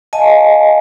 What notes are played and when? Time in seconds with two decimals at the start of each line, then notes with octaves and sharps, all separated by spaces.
0.13 D#5 F5 G#5 A5